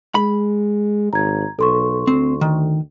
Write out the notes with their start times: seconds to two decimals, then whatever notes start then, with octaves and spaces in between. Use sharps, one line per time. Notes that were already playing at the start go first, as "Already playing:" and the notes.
0.15 G#3 B5
1.13 G#1 A#5 G#6
1.59 B1 A4 C6 C#6
2.07 D2 C4
2.41 D#3